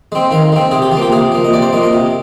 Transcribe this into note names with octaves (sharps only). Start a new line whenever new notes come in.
G#3 C4
D#3 F5
G#3 C4
C3 G#4
G4
F3 A#3 F4
G4
C3 G#4
F3 A#3
D#5
C3 D5
C5
F3 A#3 D#5
D#5
C3